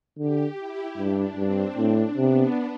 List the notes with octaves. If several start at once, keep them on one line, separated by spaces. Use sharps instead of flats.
D3 G4
E4
G2 D4
G2 C4
A2 D4
C3 B3